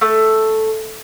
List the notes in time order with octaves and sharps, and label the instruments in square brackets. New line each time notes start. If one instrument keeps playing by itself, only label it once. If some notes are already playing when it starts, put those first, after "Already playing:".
[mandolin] A3